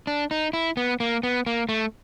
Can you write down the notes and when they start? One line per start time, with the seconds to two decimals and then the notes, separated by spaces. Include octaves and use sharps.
0.07 D4
0.31 D#4
0.53 E4
0.77 B3
1.00 A#3
1.23 B3
1.46 A#3
1.69 A3